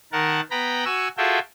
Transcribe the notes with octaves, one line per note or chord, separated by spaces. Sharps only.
D#3 A#4 F#5 A5
B3 G5 A#5 B5
F#4 G#5 C#6 E6
F4 F#4 G#4 A4 E5 G5